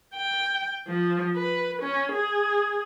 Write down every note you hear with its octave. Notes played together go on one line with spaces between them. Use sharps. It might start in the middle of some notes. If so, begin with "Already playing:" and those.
G5
F3
B4
C#4
G#4